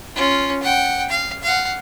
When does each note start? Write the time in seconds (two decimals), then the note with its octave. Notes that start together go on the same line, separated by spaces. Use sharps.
0.15 C#4 F4
0.62 F#5 G5
1.09 F5
1.43 F5 F#5